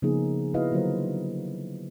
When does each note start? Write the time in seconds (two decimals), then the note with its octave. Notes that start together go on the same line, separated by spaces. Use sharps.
0.02 C#3 F3 A#3 B3 D#4 G#4
0.54 B3 E4 F#4 B4 D#5 F5
0.72 D3 F#3 A#3 F4 A#4 C5